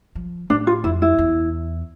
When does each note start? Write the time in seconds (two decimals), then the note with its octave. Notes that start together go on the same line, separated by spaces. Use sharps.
0.15 F3
0.50 A2 D4
0.67 F4
0.84 F2 E4
1.02 E4
1.18 E2